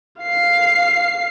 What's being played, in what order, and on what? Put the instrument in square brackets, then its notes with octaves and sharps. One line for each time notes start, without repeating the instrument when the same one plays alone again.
[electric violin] F5 C7